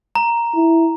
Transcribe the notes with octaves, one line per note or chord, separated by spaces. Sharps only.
A#5
E4